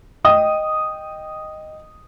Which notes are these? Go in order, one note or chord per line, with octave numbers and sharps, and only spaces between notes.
D#5 G5 D#6